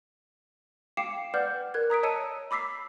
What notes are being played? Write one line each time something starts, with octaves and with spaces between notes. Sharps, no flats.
F5 G5 D6 C7 C#7 E7
B4 D5 F#5 D6 F6 G6
A#4 F#6 G#6
A#5 D#6 B6 D7
C#5 D#5 A5 E6 C#7 D#7
B5 D6 E6 B6 C7